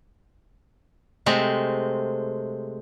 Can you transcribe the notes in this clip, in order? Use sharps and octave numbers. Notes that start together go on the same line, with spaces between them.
C3 G#3 A3 C4